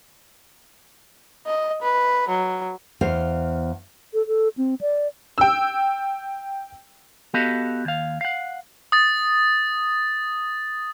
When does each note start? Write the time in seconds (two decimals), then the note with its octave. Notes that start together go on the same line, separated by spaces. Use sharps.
1.46 D#5
1.82 B4
2.29 F#3
3.01 E2 C5 F5
4.14 A4
4.27 A4
4.58 C4
4.81 D5
5.38 G5 E6
7.34 B3 F#4 G4 A4 D#5 F5
7.85 D#2 F5
8.21 F5 F#5
8.92 D#6 A6